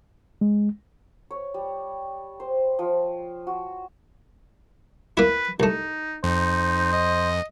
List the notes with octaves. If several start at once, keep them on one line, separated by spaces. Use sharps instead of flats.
G#3
C#5
G3
C5
F3
F#4
A#3 E4 B4
C2 A3 D#4
F2 D#4 C5
D#5